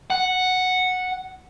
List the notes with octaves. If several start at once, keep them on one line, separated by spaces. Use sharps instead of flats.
F#5